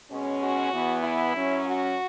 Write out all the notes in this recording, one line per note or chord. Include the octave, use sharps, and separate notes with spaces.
B2 G#3 C#4
F#4
E2 E3 B3
E4
F#2 F#3 C#4
F#4